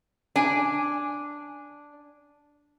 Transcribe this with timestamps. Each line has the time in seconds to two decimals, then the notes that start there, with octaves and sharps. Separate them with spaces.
0.36 D4 G#5